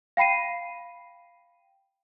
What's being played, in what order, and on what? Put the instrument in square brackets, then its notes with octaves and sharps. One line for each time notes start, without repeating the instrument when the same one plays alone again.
[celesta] F5 G5 B5 C7 D#7